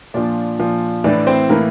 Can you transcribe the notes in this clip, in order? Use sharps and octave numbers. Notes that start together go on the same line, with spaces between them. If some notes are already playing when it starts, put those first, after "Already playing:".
A#2 F3 D4 D5
A#2 F3
A2 E3 D4 D5
C4 C5
A2 E3 A#3 A#4